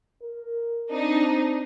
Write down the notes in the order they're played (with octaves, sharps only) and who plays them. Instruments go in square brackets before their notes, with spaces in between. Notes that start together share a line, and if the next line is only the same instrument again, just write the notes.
[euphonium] A#4
[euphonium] C4 [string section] D4 D#4